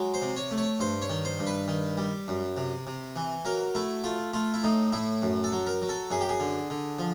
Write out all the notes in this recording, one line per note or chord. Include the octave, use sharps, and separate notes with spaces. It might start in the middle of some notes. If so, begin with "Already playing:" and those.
Already playing: F#3 G#3
C5
C3
C#5
A3
C#5
G2 C5
C#5
D#3
C5
G2
B4
D#3
G3
F#2
C3
C3
E3
F#3 A#4
A3 E4
A3 F4
A3 F4
E4
A2 D#4
A2 E4
F#2
A4
F#3
A#4
F#3
A4
F#2 G#4
G4
G#4
D3
D3
F3